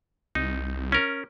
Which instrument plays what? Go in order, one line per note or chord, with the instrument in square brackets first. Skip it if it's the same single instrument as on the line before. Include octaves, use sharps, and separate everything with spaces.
[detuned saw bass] C2 [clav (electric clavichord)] D#4
[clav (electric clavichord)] C#4 A#4